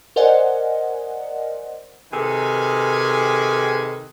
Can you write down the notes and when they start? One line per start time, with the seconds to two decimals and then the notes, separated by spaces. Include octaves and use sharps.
0.16 A#4 C5 D5 D#5 F#5 G#5
2.12 C3 D#3 G#4 A4 B4 G#5